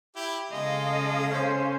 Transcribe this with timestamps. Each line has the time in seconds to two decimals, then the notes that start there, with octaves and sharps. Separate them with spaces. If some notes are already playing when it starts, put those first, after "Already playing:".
0.16 E4 G4
0.51 C#3 G#3 A4 D#5 F5
1.31 C#4 C5